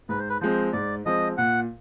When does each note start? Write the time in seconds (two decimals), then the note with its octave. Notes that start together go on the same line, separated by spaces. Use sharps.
0.09 G#2 B4
0.19 C5
0.29 B4
0.41 F3 G#3 C4 C5
0.73 G#2 D5
1.06 F3 G#3 C4 D#5
1.38 A#2 F#5